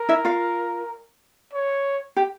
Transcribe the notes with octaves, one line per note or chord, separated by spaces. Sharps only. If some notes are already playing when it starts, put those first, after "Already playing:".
Already playing: A#4
E4 E5
F4 F5
C#5
G4